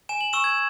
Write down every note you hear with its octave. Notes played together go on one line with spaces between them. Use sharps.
G#5 E7
F#7
C#6 E6 E7
G#6